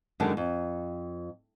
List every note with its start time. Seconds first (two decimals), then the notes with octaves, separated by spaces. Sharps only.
0.20 F#2 D3 D#3 G#3 D4
0.37 F2